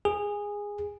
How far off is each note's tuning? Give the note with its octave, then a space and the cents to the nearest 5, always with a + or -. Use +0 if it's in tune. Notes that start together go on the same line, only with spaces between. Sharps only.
G#4 -15